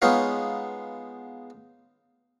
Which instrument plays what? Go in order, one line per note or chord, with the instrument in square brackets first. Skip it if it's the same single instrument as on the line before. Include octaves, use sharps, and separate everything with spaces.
[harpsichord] G#3 B3 D#4 F4 C#5 F5